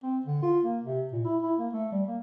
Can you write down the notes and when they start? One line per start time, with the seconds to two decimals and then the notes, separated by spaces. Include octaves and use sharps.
0.03 C4
0.26 D3
0.42 F4
0.63 A#3
0.83 C3
1.12 A#2
1.25 E4
1.43 E4
1.59 A#3
1.73 A3
1.92 G3
2.07 A#3